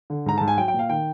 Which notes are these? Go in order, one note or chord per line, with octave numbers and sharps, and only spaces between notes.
D3
G#2 A#5
G#2 A5
G#5
F#3 G5
G5
A#2 F5
D#3 G5